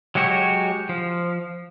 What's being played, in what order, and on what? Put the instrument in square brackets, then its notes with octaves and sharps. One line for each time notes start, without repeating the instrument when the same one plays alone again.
[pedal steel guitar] F#3 G#3 F#4 G4 C#5
F3